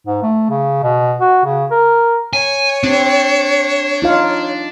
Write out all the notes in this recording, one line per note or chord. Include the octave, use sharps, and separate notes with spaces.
G#2
A3
C#3
B2
F#4
C#3
A#4
C#5 G#5
C4 D4
D#4 F4 F5